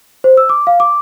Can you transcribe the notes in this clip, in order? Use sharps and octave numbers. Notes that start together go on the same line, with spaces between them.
C5
E6
D6
F5
D6